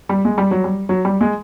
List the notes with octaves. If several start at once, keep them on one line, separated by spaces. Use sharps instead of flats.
G3
G#3
G3
F#3
G3
F#3
G3
G#3